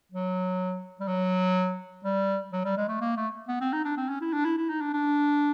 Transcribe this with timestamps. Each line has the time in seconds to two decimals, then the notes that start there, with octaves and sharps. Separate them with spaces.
0.12 F#3
1.00 G3
1.08 F#3
2.04 G3
2.52 F#3
2.64 G3
2.77 G#3
2.88 A3
3.01 A#3
3.17 A3
3.48 B3
3.61 C4
3.73 D#4
3.85 D4
3.97 C4
4.09 C#4
4.21 E4
4.33 D4
4.45 E4
4.57 E4
4.69 D#4
4.81 D4
4.93 D4